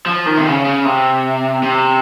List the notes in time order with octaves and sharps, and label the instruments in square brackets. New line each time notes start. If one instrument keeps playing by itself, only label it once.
[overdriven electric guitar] F3
D#3
C3
C#3
C#3
C3
C3